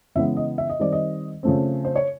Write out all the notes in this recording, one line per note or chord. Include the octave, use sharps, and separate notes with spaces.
C#3 E3 G#3 B3 E5
D#5
E5
D#5
D#3 G3 C4 D5
D#5
C#3 F3 A3 C4
C5
C#5